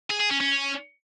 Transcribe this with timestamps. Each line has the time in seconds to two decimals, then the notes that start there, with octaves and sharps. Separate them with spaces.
0.10 G#4
0.20 G#4
0.31 C#4
0.41 C#4